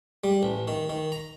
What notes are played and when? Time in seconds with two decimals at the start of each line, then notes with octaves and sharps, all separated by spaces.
0.24 G3
0.43 A1
0.68 D#3
0.89 D#3
1.12 A#5